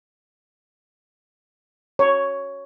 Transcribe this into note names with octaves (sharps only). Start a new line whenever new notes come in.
C#5